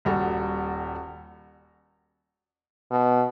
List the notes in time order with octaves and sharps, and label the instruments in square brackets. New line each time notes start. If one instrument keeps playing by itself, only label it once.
[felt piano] D#1 G3 F#4 A4
[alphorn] B2